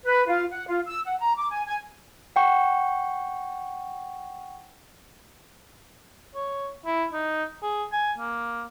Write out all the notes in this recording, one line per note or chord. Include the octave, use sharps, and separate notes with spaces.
B4
F4
F#5
F4
E6
F#5
A#5
D6
G#5
G#5
F#5 G5 C#6
C#5
E4
D#4
G#4
G#5
A#3